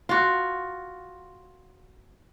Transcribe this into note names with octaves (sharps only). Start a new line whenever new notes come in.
F4 F#4